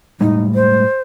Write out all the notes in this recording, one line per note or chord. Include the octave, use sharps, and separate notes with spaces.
A2 G3 G#3 D#4
C5